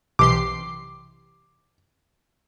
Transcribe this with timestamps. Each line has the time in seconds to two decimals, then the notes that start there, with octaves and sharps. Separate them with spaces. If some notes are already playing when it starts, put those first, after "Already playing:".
0.19 B1 C3 E3 G4 C6 D6 C7